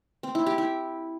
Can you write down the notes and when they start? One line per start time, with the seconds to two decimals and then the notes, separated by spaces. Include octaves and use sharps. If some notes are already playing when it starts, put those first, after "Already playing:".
0.23 C4
0.35 E4
0.46 G4
0.58 E4